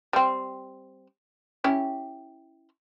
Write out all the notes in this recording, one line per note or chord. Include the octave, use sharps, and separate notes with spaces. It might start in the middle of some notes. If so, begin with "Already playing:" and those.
G3 C4
C#4 E4 G4